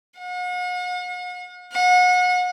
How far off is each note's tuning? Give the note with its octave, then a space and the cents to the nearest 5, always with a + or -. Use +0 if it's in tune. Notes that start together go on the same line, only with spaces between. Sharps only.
F#5 -45
F#5 -35